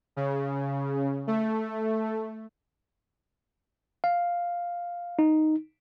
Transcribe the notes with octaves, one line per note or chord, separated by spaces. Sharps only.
C#3
A3
F5
D#4